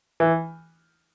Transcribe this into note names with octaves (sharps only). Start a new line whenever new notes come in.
E3